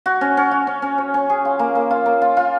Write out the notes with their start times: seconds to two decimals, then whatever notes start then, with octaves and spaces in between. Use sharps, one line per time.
0.06 F#4
0.21 C#4
0.37 C#4
0.51 F#4
0.67 C#4
0.82 C#4
0.98 C#5
1.14 C#4
1.30 G#4
1.45 F4
1.59 A#3
1.75 A#3
1.91 F4
2.06 A#3
2.22 F4
2.37 F4